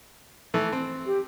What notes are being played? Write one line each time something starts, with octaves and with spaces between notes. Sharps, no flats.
E3 A3
C4
G4